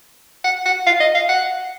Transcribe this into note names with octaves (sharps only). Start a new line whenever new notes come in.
F#5
F#5
F5
D#5
F5
F#5